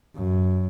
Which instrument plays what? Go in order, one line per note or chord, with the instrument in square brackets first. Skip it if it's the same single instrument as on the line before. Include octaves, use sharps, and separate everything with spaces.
[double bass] F#2